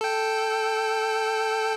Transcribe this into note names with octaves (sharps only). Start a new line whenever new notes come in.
A4 G5